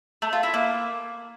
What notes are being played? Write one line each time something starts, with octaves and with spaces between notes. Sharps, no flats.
A3
F4
E4
A#3